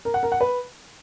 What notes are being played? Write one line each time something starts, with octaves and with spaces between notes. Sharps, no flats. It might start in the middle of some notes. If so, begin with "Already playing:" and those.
A#4
F#5
A#4
F#5
B4